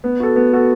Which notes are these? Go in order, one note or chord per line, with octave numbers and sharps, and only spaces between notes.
B3
F#4 A4
B3
F#4 A4